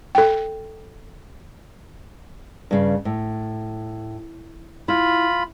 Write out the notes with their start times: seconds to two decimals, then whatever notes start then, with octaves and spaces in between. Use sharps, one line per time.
0.15 A4 G5
2.71 G2 C#3
3.05 A2
4.88 E4 F4 B5